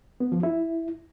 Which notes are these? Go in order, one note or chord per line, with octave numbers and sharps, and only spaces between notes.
B3
F3
E4